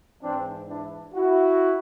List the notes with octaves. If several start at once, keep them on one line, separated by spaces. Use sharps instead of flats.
G#2 E3 C4 D4
D4 E4
E4 F#4